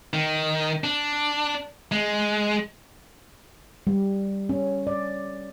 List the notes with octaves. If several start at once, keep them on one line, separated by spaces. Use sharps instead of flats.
D#3
D4
G#3
G3
C#4
D5